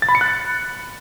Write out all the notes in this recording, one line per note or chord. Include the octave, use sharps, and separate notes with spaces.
A6
B5
C#7
F#6